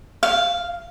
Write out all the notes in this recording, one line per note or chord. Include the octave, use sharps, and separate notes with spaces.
F5